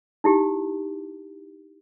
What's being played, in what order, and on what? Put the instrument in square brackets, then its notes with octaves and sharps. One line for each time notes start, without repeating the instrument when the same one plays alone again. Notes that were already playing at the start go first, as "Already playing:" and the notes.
[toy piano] D#4 E4 G4